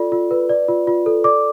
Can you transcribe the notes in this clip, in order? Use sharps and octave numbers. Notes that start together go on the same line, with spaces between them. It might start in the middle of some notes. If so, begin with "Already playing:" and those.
Already playing: F4 A4 D5
F4
B4
D5
F4
F4
A4
D5 D6